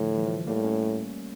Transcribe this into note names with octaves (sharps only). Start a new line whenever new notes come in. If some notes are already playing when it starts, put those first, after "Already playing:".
Already playing: A2 D3 F3
E3 G3
F3 A3
A2 G3 A#3
A3 C#4